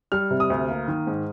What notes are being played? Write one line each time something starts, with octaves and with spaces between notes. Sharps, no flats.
G3 F6
C3
D#6
D2
A#3
D#3
G#2